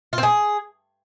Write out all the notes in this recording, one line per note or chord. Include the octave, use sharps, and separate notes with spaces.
F4
C4
G#4